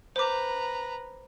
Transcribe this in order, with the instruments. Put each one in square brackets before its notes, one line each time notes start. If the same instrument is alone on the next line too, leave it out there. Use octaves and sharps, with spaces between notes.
[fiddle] B4 A#5 [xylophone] C5 D6